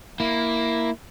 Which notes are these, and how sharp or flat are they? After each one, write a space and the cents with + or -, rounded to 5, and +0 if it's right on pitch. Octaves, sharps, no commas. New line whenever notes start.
A#3 +0 E4 +0